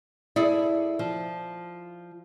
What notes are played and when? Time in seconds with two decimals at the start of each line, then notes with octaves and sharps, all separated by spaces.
0.36 E4 G#4 A4 D5
0.99 F3